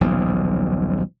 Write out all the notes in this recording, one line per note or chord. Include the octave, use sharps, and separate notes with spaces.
D#1 B1 F3